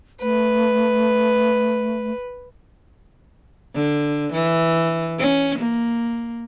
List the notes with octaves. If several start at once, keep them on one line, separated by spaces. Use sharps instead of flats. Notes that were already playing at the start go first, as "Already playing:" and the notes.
A3 B4
D3
E3
C#4
A#3